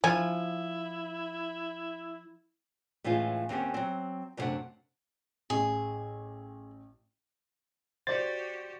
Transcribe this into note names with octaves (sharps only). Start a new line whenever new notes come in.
F3 E4 G#5
A2 E3 G#3 C#4 F4
D#2 C4 C#4 G4 F#5
F#3 C4
F#2 C3 F3 A3 D4 F#5
A1 G#4
F#4 G4 C5 D5 A6